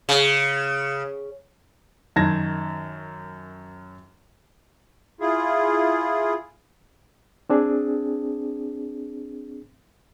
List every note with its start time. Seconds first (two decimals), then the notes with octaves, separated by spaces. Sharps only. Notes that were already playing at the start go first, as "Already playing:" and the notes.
0.09 C#3
2.16 F#2 D#3 A5 G#6 A#6
5.21 E4 F4 G#4
7.50 C4 D4 G#4